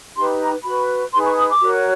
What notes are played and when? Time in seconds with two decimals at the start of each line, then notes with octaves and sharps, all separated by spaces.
0.15 D#4 G4 B4 C6
0.40 A#5
0.64 F#4 B4 B5
1.12 D#4 G#4 B4 C6
1.25 C#6
1.37 D#6
1.49 D6
1.61 F#4 A#4 C#5